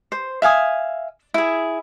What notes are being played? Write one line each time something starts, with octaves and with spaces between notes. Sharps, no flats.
C5
E5 F5 G#5 D#6
E4 G#4